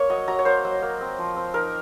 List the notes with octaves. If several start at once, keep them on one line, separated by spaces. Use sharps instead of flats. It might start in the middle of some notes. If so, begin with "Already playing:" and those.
Already playing: A#3 C#5
F#3 D#5
F#3 A#5
C#5
A#3 C5
F#3
A#3
C4
F3
C4
D#4 A#4